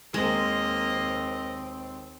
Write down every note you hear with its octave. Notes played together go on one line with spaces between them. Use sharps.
D#2 G#3 A#3 C4 D#5